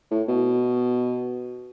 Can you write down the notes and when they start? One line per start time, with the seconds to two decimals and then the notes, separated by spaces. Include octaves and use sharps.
0.11 A2
0.28 B2